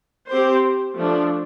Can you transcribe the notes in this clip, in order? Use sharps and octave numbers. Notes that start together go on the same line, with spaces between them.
C4 G4 C5
F3 A3 D4